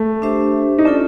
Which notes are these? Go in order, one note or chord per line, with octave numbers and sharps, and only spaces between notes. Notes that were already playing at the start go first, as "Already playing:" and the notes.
Already playing: A3
D4 G4 C5 E5
D#4
C#4 D4 F4 A4